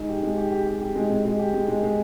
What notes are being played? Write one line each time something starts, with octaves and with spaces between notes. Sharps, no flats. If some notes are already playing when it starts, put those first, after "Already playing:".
Already playing: G#3 D#4
G4
G#3
G4
G4
G4
G4
G#3
G#3
G#3
G4
G#3
G#3
G#3